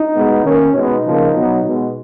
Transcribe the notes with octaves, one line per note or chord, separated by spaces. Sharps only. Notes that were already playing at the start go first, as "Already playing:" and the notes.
Already playing: D#4
B2 G#3 B3
D#3 A#3 C#4
B2 G#3 B3 D#4
C#3 F3 A#3
B2 F#3 B3
B2 G#3 B3